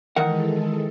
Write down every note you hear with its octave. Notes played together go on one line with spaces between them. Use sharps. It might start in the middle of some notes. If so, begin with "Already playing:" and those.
D#3 E3 G#3 A4 A#4 F#5